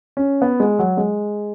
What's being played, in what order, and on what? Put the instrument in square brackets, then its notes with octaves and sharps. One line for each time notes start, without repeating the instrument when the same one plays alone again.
[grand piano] C#4
B3
G#3
F#3
G#3